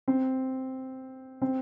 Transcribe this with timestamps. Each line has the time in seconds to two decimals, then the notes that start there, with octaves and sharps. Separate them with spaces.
0.08 C4
1.42 C4